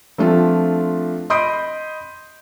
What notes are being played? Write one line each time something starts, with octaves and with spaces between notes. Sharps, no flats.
F3 A3 C4 D4 F4
D#5 B5 C6 D#6 G6 D7